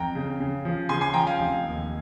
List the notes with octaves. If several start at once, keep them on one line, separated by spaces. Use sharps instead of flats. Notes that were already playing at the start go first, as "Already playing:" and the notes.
Already playing: F2 G5 A#5
C#3
C#3
F3
C#3 G#5 C6
G#5 C6
F3 G5 A#5
F5 G#5
F1
D#2